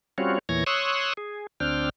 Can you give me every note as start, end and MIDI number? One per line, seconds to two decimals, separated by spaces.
0.18 0.39 55
0.18 0.39 60
0.18 0.39 61
0.18 0.39 65
0.18 0.39 66
0.18 0.39 73
0.49 0.64 40
0.49 0.64 46
0.49 0.64 52
0.49 0.64 73
0.49 0.64 92
0.49 0.64 94
0.66 1.13 73
0.66 1.13 84
0.66 1.13 85
0.66 1.13 87
0.66 1.13 88
0.66 1.13 90
1.17 1.47 68
1.60 1.89 38
1.60 1.89 60
1.60 1.89 62
1.60 1.89 79
1.60 1.89 89